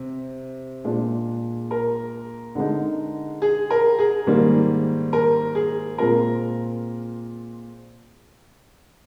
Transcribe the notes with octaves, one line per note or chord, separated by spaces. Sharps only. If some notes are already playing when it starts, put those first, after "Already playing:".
Already playing: C3
A#2 G#3 D4
A#4
D3 G#3 D#4
G#4
A#4
G#4
G#2 D#3 G3 A#3
A#4
G#4
A#2 G#3 C4 F4 A#4